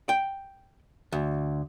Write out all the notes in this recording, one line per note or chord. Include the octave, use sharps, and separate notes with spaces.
G5
D2